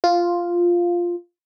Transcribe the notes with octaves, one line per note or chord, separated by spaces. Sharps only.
F4